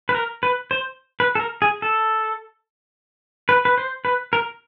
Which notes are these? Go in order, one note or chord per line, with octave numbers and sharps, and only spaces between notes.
B4
A#4
B4
C5
B4
A4
A#4
G#4
A4
B4
B4
C5
B4
A#4